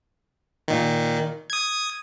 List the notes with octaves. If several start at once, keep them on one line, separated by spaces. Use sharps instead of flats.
A#2 D#3
D#6 G#6